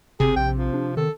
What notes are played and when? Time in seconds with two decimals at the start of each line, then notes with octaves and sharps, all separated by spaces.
0.20 G1 C3 G#4
0.36 A#1 G5
0.57 F3
0.74 D4
0.97 D#3 A4